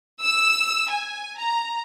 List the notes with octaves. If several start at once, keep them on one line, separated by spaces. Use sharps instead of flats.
E6
G#5
A#5